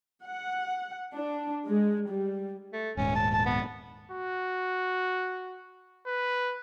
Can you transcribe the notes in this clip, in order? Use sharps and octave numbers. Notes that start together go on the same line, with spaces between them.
F#5
D4
G#3
G3
A3
D#1 G#2 C#4
A5
A5
B3
F#4
B4